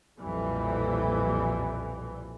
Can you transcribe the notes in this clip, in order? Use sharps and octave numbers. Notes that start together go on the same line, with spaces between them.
B1 F2 A#2 E3 G3